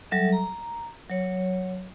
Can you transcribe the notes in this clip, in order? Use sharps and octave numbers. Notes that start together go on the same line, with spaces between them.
F#3 G3 A4 E5
A#5
F#3 C#5